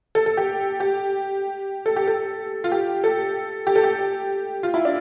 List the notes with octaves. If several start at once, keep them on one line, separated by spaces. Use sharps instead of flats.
A4
A4
G4
G4
A4
G4
A4
F4
G4
A4
G4
A4
G4
F4
E4
D4